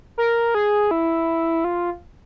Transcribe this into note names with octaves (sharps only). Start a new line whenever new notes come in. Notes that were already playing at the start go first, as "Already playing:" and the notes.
A#4
G#4
E4
F4